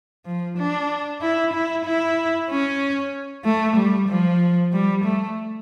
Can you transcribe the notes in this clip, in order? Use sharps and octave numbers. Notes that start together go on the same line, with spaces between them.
F3
D4
E4
E4
E4
C#4
A3
G3
F3
G3
A3